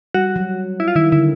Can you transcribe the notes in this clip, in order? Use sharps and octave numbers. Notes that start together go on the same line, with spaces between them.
G3 F#4
F#3
E4
F4
D#3 E4
D3 E4